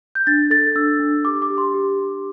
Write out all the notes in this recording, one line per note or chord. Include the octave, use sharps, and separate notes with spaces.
G6
D4 A6
A4 A6
D4 E6
D4
G4 D6
D6
G4
C6
G4
G4